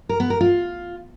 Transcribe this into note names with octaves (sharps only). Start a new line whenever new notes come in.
A#4
B3
A#4
F4